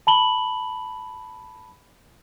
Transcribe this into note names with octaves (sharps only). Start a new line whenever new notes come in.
A5 B5 F#7 G7